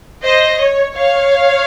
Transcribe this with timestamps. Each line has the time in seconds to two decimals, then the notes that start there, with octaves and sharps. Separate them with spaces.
0.23 C5 D#5
0.59 C#5
0.94 C#5 F5